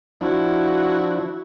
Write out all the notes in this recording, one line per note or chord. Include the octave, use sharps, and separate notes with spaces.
F3 D4 E4 F#4